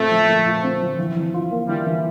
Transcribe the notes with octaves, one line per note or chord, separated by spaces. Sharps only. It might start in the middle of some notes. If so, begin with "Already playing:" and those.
Already playing: A#2 A3 C4 F4
F3
A#2
F4
C4
F3
E3
E3
F4
A#3
E3 G3
E3